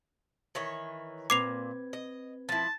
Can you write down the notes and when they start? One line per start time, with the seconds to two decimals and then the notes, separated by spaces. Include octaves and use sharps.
0.55 D#3 E3 C#5
1.30 A#2 C4 B4 D6 G#6 C7 F7
1.93 D#5
2.49 F3 E4 A5